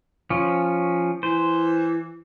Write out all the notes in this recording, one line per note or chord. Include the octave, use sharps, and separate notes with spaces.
F3 C#4
E3 C5